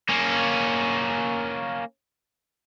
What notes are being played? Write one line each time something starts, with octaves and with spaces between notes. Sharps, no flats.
A#3 C#4